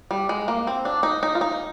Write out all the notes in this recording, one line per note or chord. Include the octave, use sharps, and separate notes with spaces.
G3
G#3
A#3
C4
D4
D#4
D#4
F4
D#4